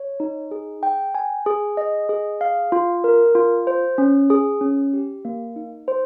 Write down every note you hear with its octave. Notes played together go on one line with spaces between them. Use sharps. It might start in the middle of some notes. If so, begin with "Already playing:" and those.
Already playing: C#5
D#4
G#4
G5
G#5
G#4
D#5
G#4
F5
F4
A#4
F4
C5
C#4
G#4
C#4
G4
A#3
D#4
C5